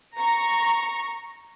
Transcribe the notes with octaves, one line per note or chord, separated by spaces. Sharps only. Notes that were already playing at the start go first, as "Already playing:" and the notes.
A#5 C#6